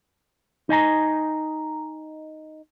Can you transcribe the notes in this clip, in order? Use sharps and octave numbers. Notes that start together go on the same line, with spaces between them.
D#4 D#5 G#5 A#5